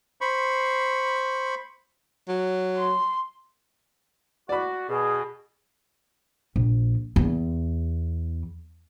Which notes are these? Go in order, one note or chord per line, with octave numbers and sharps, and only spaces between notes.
C5 B5 C#6
F#3
C6
F#4 D5 B5
B2 G#4
A#1
E2